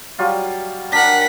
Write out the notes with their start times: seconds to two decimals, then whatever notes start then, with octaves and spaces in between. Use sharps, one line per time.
0.19 F#3 G3 F4
0.92 D4 A#4 F#5 B6